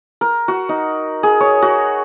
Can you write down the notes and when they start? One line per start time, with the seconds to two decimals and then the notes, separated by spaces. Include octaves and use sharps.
0.21 A#4
0.48 F#4
0.69 D#4
1.23 G#4
1.40 C#5
1.62 F#4